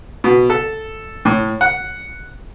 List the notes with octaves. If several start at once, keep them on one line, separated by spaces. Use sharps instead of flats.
B2
A4
A2
F#5